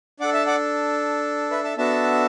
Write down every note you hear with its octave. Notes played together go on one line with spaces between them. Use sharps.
D4 A4 D5 F#5
E5 A5
D5 F#5
B4 E5
E5 A5
B3 D4 F#4 A4 E5 A5